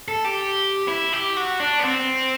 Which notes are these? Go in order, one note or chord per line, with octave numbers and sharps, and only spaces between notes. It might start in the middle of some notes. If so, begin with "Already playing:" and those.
A4
G4
E4
G4
F#4
D4
B3
C4